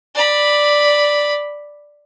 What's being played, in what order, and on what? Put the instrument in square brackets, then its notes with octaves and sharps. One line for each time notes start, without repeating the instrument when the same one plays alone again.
[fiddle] D5 B5